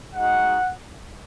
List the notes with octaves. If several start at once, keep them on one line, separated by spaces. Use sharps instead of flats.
G#3 D#4 F#4 F#5